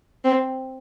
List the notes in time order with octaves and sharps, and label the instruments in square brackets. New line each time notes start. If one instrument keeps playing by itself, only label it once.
[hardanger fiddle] C4